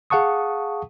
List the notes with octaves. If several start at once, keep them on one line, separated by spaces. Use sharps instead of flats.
G#4 F5 F#5 A5 C#6 D#6